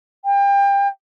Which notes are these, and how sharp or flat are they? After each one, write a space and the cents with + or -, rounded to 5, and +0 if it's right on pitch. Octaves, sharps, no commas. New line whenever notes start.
G5 +30